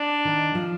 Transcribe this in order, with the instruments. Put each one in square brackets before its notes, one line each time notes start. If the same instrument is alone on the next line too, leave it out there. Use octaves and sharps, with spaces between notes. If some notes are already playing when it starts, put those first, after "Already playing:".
Already playing: [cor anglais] D4
[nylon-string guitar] D#3
F3